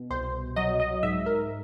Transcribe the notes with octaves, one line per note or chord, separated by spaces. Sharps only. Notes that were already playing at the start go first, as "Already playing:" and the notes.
Already playing: B2
C2 C5
F#3 D#5
D#5
G#2 E5
A#4